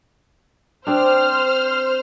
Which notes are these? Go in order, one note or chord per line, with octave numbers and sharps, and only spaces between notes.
C4 D4 C5 F6